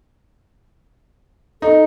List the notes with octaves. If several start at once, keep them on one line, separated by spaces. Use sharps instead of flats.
D#4 A4